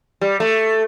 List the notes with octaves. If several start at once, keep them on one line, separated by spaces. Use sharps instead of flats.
G3
A3